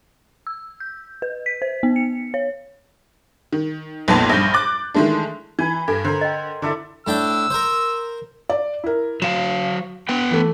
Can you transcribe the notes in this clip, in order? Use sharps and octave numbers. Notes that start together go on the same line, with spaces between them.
E6
G6
B4
B6
C5
B3
C#7
C#5
D#3
B1 F2 A#2 B3 A5 C6
A#1 G2 G6
D6 F#6 A6
D#3 E3 G#3 A3 D4
E3 G#5 B5
G2 A4 G#5
D3 A#4 C5
D#5 G5
D3 E4 A4 D5
A2 D4 G5 E6
A#4 C5
D5
E4 A#4
F#3 F5 E7
B3 B4 G5
E3 A3